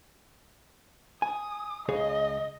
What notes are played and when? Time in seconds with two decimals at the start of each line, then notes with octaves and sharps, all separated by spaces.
1.22 G#5 D#6
1.89 C#2 G#4 C#5 D#5